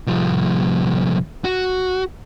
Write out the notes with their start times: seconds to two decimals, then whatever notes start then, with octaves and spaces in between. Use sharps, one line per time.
0.07 C2 F3
1.44 F#4